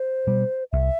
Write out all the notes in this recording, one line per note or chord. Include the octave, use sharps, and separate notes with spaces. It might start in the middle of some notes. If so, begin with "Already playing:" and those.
Already playing: C5
B2 G3
C2 E5